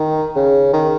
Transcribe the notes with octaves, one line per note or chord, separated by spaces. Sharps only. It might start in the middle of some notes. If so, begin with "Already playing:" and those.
Already playing: D#3
C#3
D#3